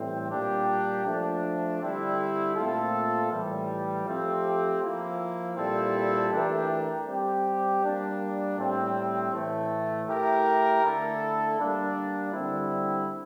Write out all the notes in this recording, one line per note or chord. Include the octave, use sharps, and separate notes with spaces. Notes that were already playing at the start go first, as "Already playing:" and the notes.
Already playing: A2 E3 G3 C4
A#2 G3 A#3 D4 G4
F3 A3 D4
D3 G3 C4 E4
A#2 A3 C4 F4 A4
A2 E3 G3
F3 A3 C4 G4
F3 A#3 E4
A#2 G3 C4 E4 A4
E3 A3 D4 G4 A#4
G3 C4 G4
G3 A#3 D4
A2 G3 C4
A2 E3 A3
A3 E4 G4 A#4
D3 A3 E4 A4
G3 A#3 D4
D3 G3 C4 E4